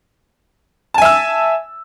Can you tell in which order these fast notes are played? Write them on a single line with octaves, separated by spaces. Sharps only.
A5 G#5 E5 E6